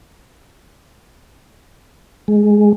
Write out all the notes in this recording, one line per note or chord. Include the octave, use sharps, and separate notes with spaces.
G#3